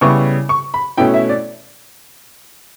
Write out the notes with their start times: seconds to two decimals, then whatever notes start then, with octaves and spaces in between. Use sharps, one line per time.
0.01 C#3 G3 B3 E4 C#6
0.49 C#6
0.74 B5
0.97 B2 A3 C#4 E4 G5
1.14 E5
1.29 D5